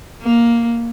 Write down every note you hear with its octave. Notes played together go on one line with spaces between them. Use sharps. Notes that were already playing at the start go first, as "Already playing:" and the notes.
A#3